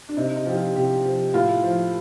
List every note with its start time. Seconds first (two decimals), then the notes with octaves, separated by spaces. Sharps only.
0.09 D4
0.17 C3 D#4
0.36 D#4
0.46 F3 G4
0.56 F4
0.75 C3 G4
1.05 F3
1.34 A2 F4
1.63 F3